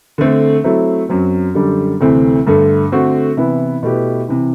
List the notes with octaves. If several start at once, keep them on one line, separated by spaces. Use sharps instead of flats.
D3 A3 C4
F#3 A3 C4 E4
F#2 F#3 C4
F#2 D3 G3 D4 G4
D2 C3 E3 A3 C4
G2 D3 A3
D3 A3 C4 F#4
C3 E3 B3 E4
B2 A3 E4 G4 B4
C3 E3